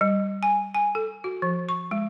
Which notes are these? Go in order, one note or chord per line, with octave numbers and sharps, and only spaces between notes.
G3
G#5
G#5
A4
F#4
F3
C#6
G#3